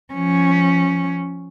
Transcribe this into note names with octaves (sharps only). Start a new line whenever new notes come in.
F3 C#4